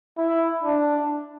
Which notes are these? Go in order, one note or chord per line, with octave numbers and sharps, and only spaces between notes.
E4
D4